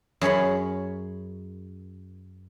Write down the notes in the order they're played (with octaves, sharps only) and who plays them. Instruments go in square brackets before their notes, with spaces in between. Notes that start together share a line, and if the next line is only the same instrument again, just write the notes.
[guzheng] F#2 G#4 C#5 B5